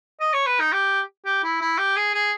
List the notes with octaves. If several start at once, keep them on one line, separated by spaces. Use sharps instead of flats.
D#5
C#5
B4
D#4
G4
G4
E4
E4
G4
G#4
G#4